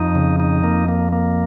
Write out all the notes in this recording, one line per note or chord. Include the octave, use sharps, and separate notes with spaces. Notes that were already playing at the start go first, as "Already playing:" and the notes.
Already playing: F2 D#4
C#3
D#4
A#3
A#3
A#3